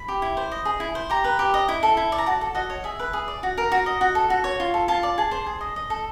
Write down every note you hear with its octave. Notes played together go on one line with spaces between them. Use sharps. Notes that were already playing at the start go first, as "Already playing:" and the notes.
Already playing: B5
G4
E4
C5
D#5
G#4
E4
C5
G4 A#5
B4
G4
D#5
E4
A4
E4
D5
A#5
F#4 A5
A4
F#4 D#5
C#5
G#4 E5
B4
G#4
D5
F#4
A#4
F#4
D#5
F#4
A4
F#4
C#5
F4
A4
F4 A5
D5
G#4 A5
C5
G#4
D#5
D#5
A4